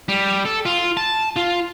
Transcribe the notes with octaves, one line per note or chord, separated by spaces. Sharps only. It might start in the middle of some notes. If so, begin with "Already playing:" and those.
G3
A4
F4
A5
F4